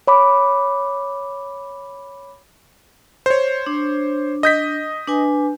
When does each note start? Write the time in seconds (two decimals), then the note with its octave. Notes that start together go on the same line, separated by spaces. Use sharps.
0.07 C#5 B5 D6
3.26 C5 C#5
3.67 D4
4.43 D#5 G6 B6
5.08 D4 B4 G#5